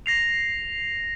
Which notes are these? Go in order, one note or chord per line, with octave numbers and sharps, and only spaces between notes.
A#6 C7 F7